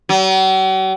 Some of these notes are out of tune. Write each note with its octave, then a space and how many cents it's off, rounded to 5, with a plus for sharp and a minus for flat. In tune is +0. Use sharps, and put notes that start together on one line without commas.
F#3 +45